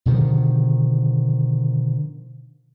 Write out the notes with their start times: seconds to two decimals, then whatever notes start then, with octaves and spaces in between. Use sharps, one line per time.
0.06 B2 D3 D#3 F3